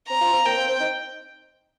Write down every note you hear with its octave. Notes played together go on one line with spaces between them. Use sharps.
C4 A#5
F4
C4
A#3 G5
C4
C4
D#4